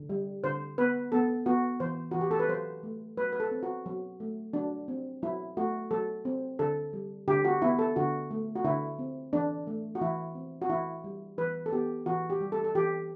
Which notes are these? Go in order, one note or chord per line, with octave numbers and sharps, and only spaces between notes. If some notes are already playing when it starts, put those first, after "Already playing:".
Already playing: D3
G3
D3 C5
B3 B4
B3 A4
B3 F#4
E3 C5
E3 F#4
G4
A4
B4
F#3 C5
A3
F#3 B4
B4
A4
C4
F#4
F#3
A3
F#3 D4
C4
F#3 E4
A3 F#4
F#3 A4
C4
D3 A4
G3
D3 G4
F#4
B3 E4
A4
D3 F#4
A3
F#4
D3 E4
C4
E3 D4
A3
F#4
E3 E4
C4
F#4
E3 E4
G3
E3 B4
A4
B3 G4
E3 F#4
G4
G3
A4
A4
E3 G4